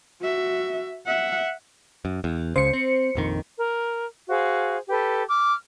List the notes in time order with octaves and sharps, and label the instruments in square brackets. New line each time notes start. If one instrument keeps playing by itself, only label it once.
[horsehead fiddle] F#4 E5
E5 F#5
[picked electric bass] F#2
E2
[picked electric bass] C#2 C#3 [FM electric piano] C5 C#7
[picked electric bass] C4
A#1 F2 D#3
[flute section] A#4
F#4 G#4 C5 F5
G4 A4 B4
D6 F6